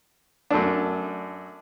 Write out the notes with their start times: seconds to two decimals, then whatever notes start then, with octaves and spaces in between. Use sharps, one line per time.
0.50 F#2 A3 D4